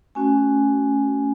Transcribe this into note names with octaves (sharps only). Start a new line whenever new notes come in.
A3 C#4 F#4 G#5